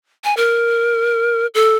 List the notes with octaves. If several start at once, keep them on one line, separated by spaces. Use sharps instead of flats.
G#5
A#4
A4